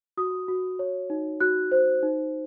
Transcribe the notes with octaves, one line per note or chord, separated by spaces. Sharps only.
F#4 D#6
F#4
C#5
D#4
F#4 F#6
C5
D#4